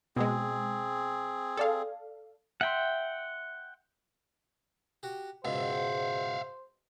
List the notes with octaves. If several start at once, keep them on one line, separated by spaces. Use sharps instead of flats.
B2 G#3 C4 G#4
A4 D5 F5
E5 F#5 G5 C6
F#4 G4
C#2 G#2 B2 C5 E5 F5